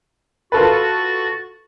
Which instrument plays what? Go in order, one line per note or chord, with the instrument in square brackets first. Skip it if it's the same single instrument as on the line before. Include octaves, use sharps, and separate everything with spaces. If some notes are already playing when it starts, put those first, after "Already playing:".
[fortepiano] F4 A4 B4 [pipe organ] F#4 A6